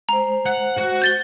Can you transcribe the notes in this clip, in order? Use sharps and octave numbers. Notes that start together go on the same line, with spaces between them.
G#3 C5 A#5
F#5
F#4
G6 A6 G7